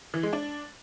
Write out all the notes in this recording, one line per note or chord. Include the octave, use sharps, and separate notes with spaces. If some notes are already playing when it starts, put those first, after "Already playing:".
E3
G#3
D4